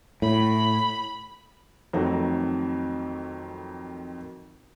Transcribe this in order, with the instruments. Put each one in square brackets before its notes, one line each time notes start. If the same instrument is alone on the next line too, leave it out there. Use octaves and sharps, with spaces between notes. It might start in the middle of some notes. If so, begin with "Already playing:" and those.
[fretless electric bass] A2 [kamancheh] B5
[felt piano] F2 D#3 F#3 A3 C4